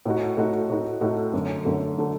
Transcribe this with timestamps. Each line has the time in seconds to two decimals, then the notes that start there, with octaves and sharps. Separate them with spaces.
0.05 A2 A3 D#4 F#4
0.37 A2 A3 D#4 F#4
0.69 A2 A3 D#4 F#4
1.01 A2 A3 D#4 F#4
1.33 F#2 D3 A3
1.65 F#2 D3 A3
1.98 D3 A3